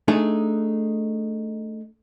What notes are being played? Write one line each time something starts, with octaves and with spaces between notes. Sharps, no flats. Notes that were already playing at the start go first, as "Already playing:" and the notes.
A3 D4 D#4 G#4